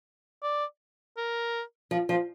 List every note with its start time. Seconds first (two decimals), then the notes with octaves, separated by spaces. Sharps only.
0.43 D5
1.17 A#4
1.91 F3
2.09 F3